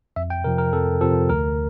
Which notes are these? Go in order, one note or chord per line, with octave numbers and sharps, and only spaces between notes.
F2 E5
G5
C3 F3 A#4
A#4
F2 A4
C3 F3 A4
D2 A#4